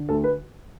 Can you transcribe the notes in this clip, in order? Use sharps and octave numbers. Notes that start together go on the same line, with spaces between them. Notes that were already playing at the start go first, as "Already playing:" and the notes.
Already playing: D3
D2 A4
B4